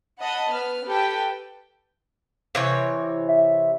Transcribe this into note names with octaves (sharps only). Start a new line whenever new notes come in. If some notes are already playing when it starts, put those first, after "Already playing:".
D#5 F#5 A5 B5
B3 B4 F6
G4 A4 B4 G5
C3 E3 C#5
E5